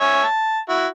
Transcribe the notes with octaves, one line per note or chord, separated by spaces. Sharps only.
C#5 E5 G#5
A5
E4 F#4